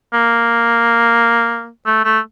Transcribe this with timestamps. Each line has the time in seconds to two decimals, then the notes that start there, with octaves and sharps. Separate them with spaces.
0.13 A#3
1.86 A3
2.05 A3